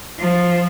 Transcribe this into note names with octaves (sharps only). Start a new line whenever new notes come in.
F3